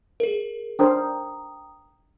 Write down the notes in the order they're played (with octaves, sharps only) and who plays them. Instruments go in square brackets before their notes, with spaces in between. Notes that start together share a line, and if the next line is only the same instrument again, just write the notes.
[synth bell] G#4 A#4
[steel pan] D4 A#4 C5 [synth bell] G5 A#5 D#6